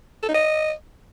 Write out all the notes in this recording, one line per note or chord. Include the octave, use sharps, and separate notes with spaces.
A4
D#4
D#5